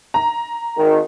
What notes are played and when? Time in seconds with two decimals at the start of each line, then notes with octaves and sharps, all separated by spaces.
0.14 A#5
0.77 G#1 D#3